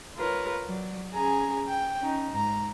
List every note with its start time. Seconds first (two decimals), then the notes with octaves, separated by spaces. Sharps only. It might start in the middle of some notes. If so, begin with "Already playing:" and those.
0.16 F4 A#4 B4 C#5
0.67 F#3 D5
1.12 C#4 G#4 G#5 A#5
1.67 G5
2.01 C#4 D#4
2.31 G#2 A#5